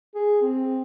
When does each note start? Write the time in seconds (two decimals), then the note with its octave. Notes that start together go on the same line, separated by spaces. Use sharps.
0.15 G#4
0.42 C4